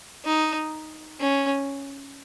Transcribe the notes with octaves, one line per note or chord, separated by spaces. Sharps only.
D#4
C#4